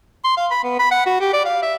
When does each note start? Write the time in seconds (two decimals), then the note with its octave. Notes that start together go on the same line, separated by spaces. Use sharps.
0.24 C6
0.37 F5
0.51 B5
0.64 B3
0.79 B5
0.91 F#5
1.06 F#4
1.20 G4
1.33 D5
1.45 F5
1.62 E5